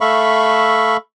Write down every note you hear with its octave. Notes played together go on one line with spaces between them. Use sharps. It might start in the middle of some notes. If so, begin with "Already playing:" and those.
A3 A4 E5 F5 B5 C#6